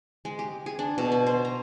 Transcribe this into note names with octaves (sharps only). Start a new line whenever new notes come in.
G#3
G4
G#4
D4
B2
F#4
C5
A#5